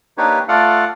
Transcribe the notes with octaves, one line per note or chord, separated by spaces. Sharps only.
A#3 D4 D#4 G4 B4 C#5
A3 F4 A4 D5 F5 F#5